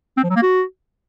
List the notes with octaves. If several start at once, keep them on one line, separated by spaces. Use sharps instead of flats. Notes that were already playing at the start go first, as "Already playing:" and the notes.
C4
F3
F#3
A#3
F#4